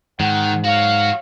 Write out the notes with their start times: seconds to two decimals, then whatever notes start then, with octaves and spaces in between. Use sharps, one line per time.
0.20 G#2 D#3 F#5
0.64 F#4 C#5 F5